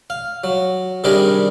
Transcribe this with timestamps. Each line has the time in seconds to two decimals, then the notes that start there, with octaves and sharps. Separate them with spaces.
0.10 F5
0.44 F#3
1.04 C3 D#3 G3 D4 G#4 A#4